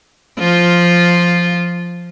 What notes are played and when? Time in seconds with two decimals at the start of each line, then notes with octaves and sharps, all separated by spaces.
0.39 F3 F4